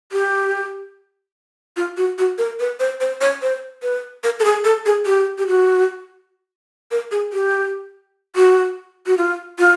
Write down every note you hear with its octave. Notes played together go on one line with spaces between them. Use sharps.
G4
F4
F#4
F#4
A#4
B4
C5
C5
C#5
C5
B4
A#4
A4
G#4
A4
G#4
G4
G4
F#4
A#4
G#4
G4
F#4
F#4
F4
F4